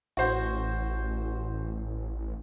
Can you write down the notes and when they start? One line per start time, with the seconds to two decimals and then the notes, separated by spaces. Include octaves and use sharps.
0.17 A1 F#4 C5